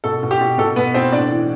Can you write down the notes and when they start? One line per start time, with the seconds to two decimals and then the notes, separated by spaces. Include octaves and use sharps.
0.04 B2 A4
0.23 B2
0.31 G4
0.41 B2
0.58 B2 A4
0.76 B2 B3 B4
0.94 B2 C4 C5
1.12 A2 D4 D5
1.31 E3